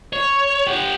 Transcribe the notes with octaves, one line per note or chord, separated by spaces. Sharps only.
C#5
G4 F#5